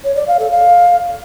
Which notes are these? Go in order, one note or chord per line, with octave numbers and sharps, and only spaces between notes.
C#5
D5
F5
A4
F5